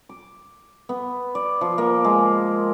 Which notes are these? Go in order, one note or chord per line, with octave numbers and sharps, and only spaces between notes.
D6
B3
D5
F3
A#3
G#3